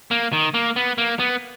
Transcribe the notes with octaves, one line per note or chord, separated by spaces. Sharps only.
A#3
D#3
A#3
B3
A#3
B3